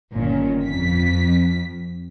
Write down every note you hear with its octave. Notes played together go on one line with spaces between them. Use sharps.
G1 A#2 D#3 C#4
F2 B6